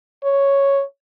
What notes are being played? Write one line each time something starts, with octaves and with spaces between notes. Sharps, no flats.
C#5